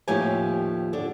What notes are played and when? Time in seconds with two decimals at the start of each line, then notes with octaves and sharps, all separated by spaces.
0.08 D#2 A2 F3 C#4 G4 G#5
0.93 D3 D4